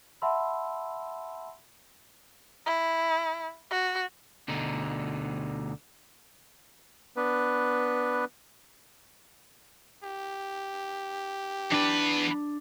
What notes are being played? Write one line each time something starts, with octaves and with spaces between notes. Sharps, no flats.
E5 F#5 A5 B5 C6 E6
E4
F#4
D2 B2 D3 D#4
B3 D4 B4
G4
E2 D4 B4